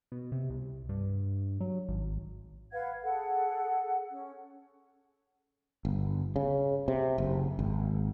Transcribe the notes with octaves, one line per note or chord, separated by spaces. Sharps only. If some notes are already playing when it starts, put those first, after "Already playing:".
B2
C3
C2
G2
F#3
G#1
B4 F5 F#5 G#6
G#4 A4 F#5
C#4
G1
C#3
C3
F#1
G#1